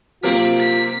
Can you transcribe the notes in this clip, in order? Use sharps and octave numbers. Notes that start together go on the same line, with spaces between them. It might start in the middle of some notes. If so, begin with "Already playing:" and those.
C3 F#3 A#3 C4 F4 A#4 B6
B6